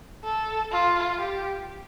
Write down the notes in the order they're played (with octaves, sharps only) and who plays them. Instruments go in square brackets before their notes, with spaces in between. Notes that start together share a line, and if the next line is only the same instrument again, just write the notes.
[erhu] A4
F4
G4